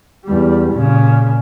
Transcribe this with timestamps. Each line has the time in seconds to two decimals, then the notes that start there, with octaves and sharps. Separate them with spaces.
0.25 E2 G3
0.72 A#2 C#3